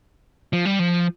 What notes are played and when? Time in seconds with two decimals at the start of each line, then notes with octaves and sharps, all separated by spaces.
0.53 F3
0.65 G3
0.79 F3